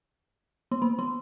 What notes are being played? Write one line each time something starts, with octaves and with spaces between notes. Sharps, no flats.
B3
A#3
B3